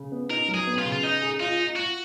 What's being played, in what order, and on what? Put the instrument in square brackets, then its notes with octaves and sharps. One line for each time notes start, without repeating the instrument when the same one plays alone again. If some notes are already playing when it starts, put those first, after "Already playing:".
Already playing: [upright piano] C#3
B3
[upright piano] D#4 [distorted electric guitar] A#4
[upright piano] F#3
[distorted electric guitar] G#4
[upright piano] B3
[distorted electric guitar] F4
[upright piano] C#3
[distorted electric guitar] F4
[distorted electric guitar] D#4 [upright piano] D#5
[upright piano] G#4
[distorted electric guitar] D#4 [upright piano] F4
[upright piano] F4
[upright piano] F4 [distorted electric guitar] F#4